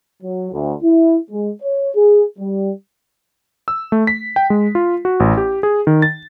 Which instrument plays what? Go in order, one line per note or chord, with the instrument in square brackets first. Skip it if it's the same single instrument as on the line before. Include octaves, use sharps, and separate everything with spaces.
[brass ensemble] F#3
D2
E4
G#3
C#5
G#4
G3
[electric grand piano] E6
A3
B6
G5
G#3
F4
F#4
A1
G4
G#4
D#3
A6